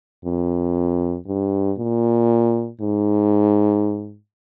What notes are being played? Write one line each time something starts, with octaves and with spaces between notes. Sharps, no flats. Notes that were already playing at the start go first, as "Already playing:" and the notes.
F2
G2
A#2
G#2